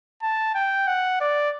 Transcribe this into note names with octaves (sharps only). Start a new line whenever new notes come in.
A5
G5
F#5
D5